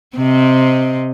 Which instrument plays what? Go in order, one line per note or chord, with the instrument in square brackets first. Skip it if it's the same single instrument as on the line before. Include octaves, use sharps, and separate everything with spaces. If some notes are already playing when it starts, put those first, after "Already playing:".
[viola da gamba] C3 C4 D#5